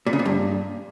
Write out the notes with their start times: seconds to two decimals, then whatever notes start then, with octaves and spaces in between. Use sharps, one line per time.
0.06 A#2
0.13 C#3
0.19 A#2
0.25 G2